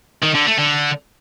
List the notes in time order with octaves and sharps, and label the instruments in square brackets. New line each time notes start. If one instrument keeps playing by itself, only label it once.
[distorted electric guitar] D#3
D3
A3
D3